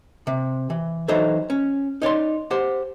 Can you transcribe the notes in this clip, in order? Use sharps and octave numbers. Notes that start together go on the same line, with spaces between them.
C3
E3
E3 F#3 D#4 A4 C5 C#5
C#4
D#4 C#5 D5 C6
G4 C5 F#5